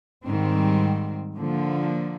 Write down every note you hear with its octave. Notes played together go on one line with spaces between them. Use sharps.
G#2 D#3 G3 C4
D3 F3 A#3